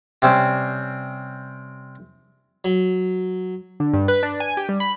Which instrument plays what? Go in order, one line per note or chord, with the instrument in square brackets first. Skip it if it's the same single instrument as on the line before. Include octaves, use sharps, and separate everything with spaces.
[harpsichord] C3 G3 C4 C#4
F#3
[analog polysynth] D3
G2
B4
D4
G#5
G4
G3
B5